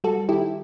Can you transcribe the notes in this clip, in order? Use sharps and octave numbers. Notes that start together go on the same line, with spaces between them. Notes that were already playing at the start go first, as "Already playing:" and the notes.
G3 F#4 A4
D#3 E4 G4